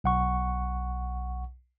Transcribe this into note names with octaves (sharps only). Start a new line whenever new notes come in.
B1 F#5 C#6